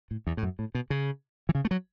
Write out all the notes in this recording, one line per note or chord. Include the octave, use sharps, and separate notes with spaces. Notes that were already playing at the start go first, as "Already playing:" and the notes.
A2
E2
A2
F#2
A2
B2
C#3
E3
C#3
A3
F#3